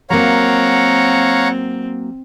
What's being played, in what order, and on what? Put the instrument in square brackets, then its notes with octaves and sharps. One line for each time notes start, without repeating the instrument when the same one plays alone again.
[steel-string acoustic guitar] F#3 A#3 [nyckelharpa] C4 [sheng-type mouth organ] C#5 F5 F#5 [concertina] A#5